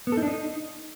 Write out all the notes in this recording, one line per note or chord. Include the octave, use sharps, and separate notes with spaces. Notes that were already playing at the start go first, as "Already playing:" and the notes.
B3
A4
D#4
D4
D#4